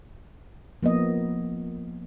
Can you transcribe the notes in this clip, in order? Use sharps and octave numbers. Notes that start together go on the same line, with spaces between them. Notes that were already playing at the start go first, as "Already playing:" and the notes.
F3 A#3 B3 D#5